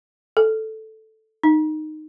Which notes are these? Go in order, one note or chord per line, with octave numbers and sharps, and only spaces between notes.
A4
D#4